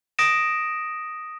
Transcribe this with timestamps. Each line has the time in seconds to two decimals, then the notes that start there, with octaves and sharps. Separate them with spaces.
0.19 D#6 A#6 D7 E7